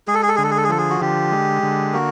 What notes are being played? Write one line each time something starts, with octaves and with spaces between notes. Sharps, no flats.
G#3 G#4
A4
G#4
A4
D3 G#4
A4
G#4
A4
G#4
F3 A4
G#4
F#4
D3 G4
G#3
D3
A#3 F#4